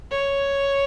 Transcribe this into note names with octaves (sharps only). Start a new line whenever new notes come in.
C#5